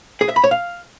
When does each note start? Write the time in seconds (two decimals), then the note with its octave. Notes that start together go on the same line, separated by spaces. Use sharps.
0.21 G#4
0.29 E5
0.36 B5
0.44 C#5
0.51 F5